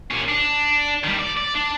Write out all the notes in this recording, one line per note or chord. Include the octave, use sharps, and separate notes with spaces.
A#2 C#4
D4
D#3 G3
D5
D5
D4